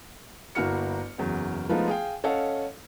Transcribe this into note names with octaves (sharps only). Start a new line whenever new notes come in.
G1 A#3 E4 F#4 F6 C#7
F#1 E2 F#3
F3 G#3 A3 B3 D#4 F4
G#4 F5 G5
C#4 A4 C#5 D#5 F5 F#5